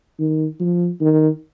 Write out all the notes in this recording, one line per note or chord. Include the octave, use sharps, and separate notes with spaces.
D#3
F3
D#3